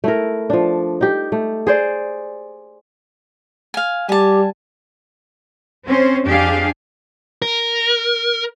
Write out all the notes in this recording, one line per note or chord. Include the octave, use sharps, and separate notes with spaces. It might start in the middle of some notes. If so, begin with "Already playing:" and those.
A3 E4 A#4
F3 D4
D#4 G4
A3
G#4 C5 D5
F5 G#5
G3 G4 G#5 A5
C4 C#4 C5
F2 D4 G4 G#4 F5
A#4